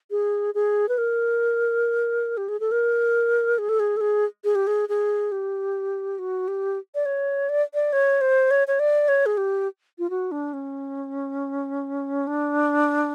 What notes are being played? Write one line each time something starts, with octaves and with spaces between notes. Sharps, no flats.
G#4
G#4
B4
A#4
G4
G#4
A4
A#4
G#4
A4
G#4
A4
G#4
G#4
G4
G#4
G#4
G4
F#4
G4
D5
C#5
D5
D5
C#5
C5
C#5
C#5
D5
C#5
G#4
G4
F4
F#4
D4
C#4
D4